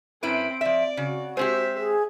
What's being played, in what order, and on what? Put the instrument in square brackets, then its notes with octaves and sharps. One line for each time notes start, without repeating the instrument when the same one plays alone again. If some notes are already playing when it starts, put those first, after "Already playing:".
[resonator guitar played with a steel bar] F#2 E4 B4 [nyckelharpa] C4 B5 [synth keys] D7
[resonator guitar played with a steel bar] F3 E5 [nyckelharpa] D5
[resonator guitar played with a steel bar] C#3 [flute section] F#4
[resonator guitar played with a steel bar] G#3 C4 G4 [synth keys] C5 [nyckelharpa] E5
[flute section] G#4